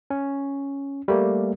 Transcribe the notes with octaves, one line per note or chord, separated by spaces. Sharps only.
C#4
G3 A3 A#3